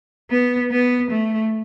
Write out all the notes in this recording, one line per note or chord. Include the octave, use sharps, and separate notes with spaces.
B3
B3
A3